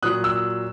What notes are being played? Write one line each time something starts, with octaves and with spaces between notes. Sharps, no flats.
A#2 F#3 D#6 F#6
E6